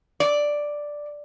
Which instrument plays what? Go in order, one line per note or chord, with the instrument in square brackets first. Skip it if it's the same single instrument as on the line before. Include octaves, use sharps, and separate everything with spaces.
[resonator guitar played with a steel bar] D5